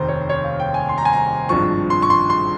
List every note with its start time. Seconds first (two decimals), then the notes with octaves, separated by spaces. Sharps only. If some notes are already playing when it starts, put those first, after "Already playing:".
Already playing: F1 D#2 D#3 C5 A#5
0.08 C#5
0.29 C#5
0.44 F5
0.60 G5
0.74 G#5
0.89 C6
0.98 A#5
1.05 G#5
1.13 A#5
1.49 G#1 G2 F3 C#6
1.90 C6
2.02 C#6
2.10 C6
2.30 C6